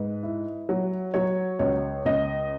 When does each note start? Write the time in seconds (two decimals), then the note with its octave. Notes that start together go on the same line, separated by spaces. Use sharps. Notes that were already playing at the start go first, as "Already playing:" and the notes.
Already playing: G#2 B4
0.23 E4
0.69 F#3
1.14 F#3 C#5
1.59 C#2 C#5
2.05 C#2 D#5